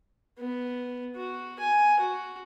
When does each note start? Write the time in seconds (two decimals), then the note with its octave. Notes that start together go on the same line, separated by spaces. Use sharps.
0.39 B3
1.16 F#4
1.60 G#5
2.00 F#4